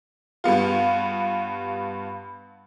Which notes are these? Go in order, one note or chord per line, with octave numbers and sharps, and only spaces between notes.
G2 G3 B3 F4